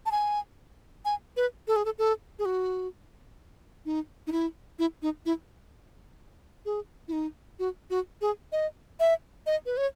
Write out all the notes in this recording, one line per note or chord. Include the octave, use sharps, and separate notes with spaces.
A5
G#5
G#5
B4
A4
G#4
A4
A4
G#4
F#4
D#4
D#4
E4
E4
D#4
E4
G#4
E4
D#4
F#4
F#4
G#4
D#5
E5
D#5
B4
C#5